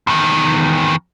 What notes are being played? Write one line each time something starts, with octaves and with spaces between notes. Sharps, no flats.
E2 D#3